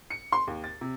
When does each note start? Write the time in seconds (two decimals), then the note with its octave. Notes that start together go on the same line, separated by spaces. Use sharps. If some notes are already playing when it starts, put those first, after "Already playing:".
0.10 C#7
0.32 C6
0.47 D#2
0.64 A6
0.81 C3